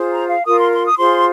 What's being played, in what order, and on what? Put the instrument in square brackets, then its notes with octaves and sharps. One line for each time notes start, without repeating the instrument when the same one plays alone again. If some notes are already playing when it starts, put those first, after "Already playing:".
Already playing: [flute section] F4 G#4 C5
A#5
F5
F4 A#4 D#6
C6
C6
D#6
F4 G#4 C5 C6